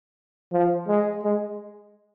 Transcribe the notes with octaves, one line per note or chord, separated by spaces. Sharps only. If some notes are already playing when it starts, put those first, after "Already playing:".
F3
G#3
G#3